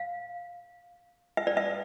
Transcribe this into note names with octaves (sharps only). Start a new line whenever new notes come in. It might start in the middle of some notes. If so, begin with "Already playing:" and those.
Already playing: F5
E5
D5
E5